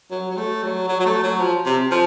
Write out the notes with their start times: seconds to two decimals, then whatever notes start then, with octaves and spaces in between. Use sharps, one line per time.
0.11 F#3
0.31 F#3
0.37 A3
0.63 F#3
0.89 F#3
1.00 F#3
1.06 A3
1.23 F#3
1.41 F3
1.66 C3
1.91 F3